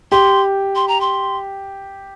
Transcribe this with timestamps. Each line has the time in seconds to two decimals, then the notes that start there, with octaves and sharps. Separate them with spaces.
0.12 G4 C6
0.75 C6
0.88 A#5
1.01 C6